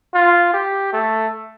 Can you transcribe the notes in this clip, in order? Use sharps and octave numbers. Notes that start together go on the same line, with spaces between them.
F4
G4
A3